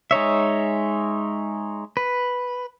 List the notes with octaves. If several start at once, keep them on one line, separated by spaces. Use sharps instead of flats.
G#3 D#4 C#5 E5
B4